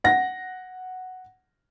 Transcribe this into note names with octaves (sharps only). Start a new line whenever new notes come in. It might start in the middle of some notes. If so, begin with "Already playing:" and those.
F#5 A#6